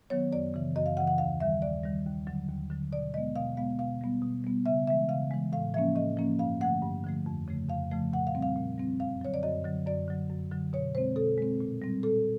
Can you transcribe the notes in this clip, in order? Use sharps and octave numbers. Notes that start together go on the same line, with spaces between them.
D#3 F#3 B3 C#5
F#2 D5
C#3 E3
F#2 D#5
F5
C#3 E3 F#5
F#5
D#2 F5
D#3 G3 E5
D#2 D5
D#3 G3
D#2
D3 F#3
D#2
D3 F#3
B2 D5
G#3 B3 D#5
B2 F5
G#3 B3 F5
B2 F5
G3 B3
B2
G3 B3
C#3 E5
E3 G#3 E5
C#3 F5
E3 G#3
A2 F5
F3 A#3 C#4 E5
A2 D#5
F3 A#3 C#4
G2 F5
D3 F3 A3 F#5
G2
D3 F3 A3
F2
C#3 F3 A3
F2 F5
C#3 F3 A3
A#2 F#5
F5
G3 C4
F5
A#2
G3 C4
F#2 F5
D3 F#3 C#5
D5
F#2 D#5
D3 F#3
F#2 D5
D3 F#3
F#2
D3 F#3
B2 C#5
G#3 C4 C5
B2 A4
G#3 C4
A#2
G3 C4
A#2 A4